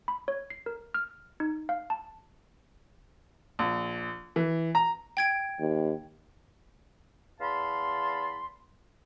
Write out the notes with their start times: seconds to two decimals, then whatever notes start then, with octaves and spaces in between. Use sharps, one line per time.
0.08 B5
0.28 C#5
0.50 C7
0.66 A#4
0.94 F6
1.40 D#4
1.69 F5
1.90 A5
3.59 A#1
4.36 E3
4.75 A#5
5.17 G5 G#6 D7
5.60 D#2
7.41 E2 F5 A5 B5 C6